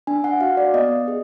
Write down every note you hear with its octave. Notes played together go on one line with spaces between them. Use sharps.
D4 G#5
F#5
F#4 F5
D5
B3 D#5
G#4